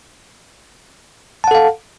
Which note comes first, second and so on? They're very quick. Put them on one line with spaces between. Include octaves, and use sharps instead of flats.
A5 F#5 A4 F5